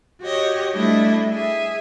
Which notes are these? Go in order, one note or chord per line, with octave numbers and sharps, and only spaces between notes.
F#4 G4 C#5 D#5
G3 A3 D4 E4 D#5
G#4 E5